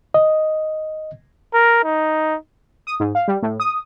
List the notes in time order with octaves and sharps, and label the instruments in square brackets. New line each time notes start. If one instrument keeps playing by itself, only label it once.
[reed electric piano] D#5
[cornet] A#4
D#4
[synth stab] D#6
G#2
F5
G3
A2
D#6